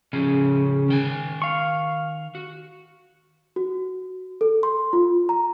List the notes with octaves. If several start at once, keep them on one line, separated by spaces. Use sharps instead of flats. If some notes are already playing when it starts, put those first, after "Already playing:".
A2 C#3 F3 C#4
D#3 G5 G#5
F5 C#6
F#4
F#4
A4
C6
F4
A#5